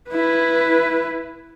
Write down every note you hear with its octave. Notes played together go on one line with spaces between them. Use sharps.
E4 B4